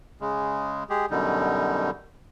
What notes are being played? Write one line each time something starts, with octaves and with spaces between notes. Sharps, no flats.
C#3 G#3
G#3 G4 G#4
F#2 B2 D3 G3 D#4